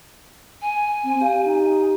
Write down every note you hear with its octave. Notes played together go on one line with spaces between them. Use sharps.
G#5
C4
G4 F5
D#4